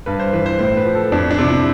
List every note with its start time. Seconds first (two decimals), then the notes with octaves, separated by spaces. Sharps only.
0.06 G2 B4
0.20 C5
0.33 E3 B4
0.46 C5
0.59 A2 C5
0.77 B4
0.86 F3
0.95 A4
1.12 F2 D4
1.31 D4
1.39 C3 F3
1.48 E4